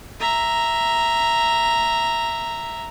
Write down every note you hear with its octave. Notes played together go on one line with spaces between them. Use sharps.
E5 A#5